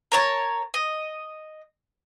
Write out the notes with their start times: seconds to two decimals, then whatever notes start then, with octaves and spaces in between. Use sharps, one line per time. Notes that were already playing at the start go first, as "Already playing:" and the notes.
0.12 A#4 C#5 A5
0.74 D#5